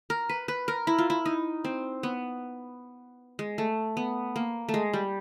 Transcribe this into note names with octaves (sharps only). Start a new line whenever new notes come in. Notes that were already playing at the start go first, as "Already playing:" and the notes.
A#4
B4
B4
A#4
E4
F4
E4
D#4
C4
B3
G#3
A3
B3
A#3
A3
G#3
G3